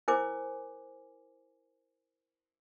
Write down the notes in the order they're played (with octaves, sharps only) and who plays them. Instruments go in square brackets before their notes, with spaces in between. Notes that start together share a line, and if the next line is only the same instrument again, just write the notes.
[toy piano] E4 A#4 C5 G#5 D6